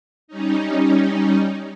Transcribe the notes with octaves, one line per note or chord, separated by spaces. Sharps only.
G3 C#4 D#4